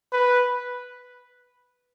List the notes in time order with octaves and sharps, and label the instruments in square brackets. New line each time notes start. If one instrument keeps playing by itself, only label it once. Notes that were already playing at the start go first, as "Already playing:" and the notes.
[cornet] B4